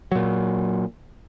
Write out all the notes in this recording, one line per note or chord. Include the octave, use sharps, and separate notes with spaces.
A#2 F#3